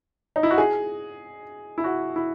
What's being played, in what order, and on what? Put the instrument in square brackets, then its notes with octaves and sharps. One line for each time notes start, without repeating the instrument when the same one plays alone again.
[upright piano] D#4
E4
F#4
G#4
E4
F#4
E4